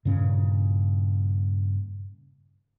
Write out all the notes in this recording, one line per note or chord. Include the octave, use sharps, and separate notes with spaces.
G2 A#2 C#3 C#4